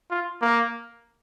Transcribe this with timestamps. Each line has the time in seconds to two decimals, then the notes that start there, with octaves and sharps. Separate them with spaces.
0.10 F4
0.42 A#3